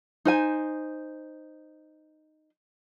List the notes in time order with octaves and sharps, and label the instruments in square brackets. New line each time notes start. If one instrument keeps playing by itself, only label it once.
[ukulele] D#4 C5 G#5